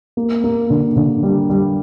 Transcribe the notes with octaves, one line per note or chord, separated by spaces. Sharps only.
A#3
A#3
D3
D3
G3
G3